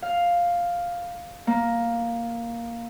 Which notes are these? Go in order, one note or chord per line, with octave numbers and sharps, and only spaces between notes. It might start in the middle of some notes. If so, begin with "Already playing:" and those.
F5
A#3